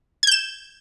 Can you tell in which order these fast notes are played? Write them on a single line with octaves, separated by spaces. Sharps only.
G#6 G6 E7